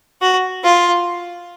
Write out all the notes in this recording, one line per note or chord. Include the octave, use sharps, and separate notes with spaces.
F#4
F4